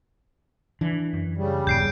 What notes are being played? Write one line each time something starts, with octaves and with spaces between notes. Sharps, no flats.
E3 D4
F#2
C#3 G3
D#1 G2 G6 C7 D7